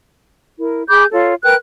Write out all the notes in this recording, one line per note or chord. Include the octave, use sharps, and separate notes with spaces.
E4 A#4
G#4 B5 D6 G6
F4 A4 C#5
A#4 B4 G5 F#6